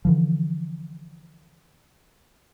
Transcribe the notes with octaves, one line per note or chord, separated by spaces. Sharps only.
D3 E3 F3